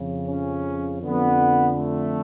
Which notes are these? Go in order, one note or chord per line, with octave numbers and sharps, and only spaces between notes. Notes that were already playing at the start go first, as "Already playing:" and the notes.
Already playing: F2 C#3
C#4
F2 D3 B3
A3